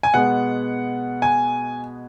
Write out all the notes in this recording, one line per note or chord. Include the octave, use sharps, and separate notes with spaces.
G#5
B2 G#3 B3 F#5
G#5